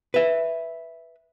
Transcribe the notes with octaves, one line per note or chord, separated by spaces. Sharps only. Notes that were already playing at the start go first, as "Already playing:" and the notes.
B4 E5